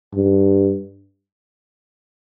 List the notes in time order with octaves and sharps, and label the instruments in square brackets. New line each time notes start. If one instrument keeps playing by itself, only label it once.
[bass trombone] G2